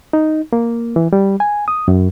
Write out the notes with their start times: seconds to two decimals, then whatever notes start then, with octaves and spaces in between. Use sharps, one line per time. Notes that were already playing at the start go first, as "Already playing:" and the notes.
0.13 D#4
0.53 A#3
0.96 E3
1.13 G3
1.40 G#5
1.68 D#6
1.88 F#2